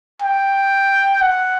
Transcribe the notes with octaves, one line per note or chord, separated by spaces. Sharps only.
G5
F#5